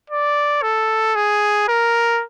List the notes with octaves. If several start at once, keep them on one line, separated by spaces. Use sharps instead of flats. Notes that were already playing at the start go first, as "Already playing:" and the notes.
D5
A4
G#4
A#4